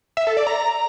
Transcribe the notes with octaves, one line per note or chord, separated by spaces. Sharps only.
E5
A4
D5
A#5